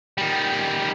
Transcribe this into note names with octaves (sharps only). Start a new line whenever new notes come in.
D#3 G3